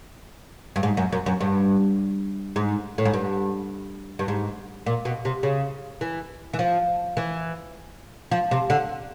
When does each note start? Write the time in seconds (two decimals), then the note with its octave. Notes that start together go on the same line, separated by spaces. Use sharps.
0.76 G2
0.83 G#2
0.97 F#2
1.12 F#2
1.26 F#2
1.41 G2
2.56 G#2
2.98 A2
3.05 G#2
3.13 G2
4.19 G2
4.28 G#2
4.86 A#2
5.05 B2
5.25 C3
5.43 C#3
6.01 E3
6.53 E3
6.59 F3
7.17 E3
8.31 F3
8.51 C3
8.70 D3